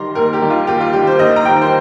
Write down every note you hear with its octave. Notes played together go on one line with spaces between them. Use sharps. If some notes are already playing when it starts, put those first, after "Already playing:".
Already playing: D#3 G3 A#5 C6
D#2 A#4
G4
D#3 G3
F4
D#2 G4
F4
D#3 G3 G4
C5
D#2 D#5
A#5
D#3 G3 G5
C5